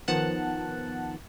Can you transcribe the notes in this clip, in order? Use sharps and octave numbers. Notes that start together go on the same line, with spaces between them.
D#3 F3 B3 F#5 A5 F#6